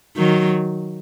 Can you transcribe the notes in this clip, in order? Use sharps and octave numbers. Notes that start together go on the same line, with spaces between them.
D#3 F#3